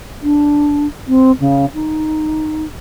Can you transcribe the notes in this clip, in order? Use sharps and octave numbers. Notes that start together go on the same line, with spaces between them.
D4
C4
C#3
D#4